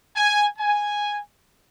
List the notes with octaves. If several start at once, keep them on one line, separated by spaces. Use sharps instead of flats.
G#5
G#5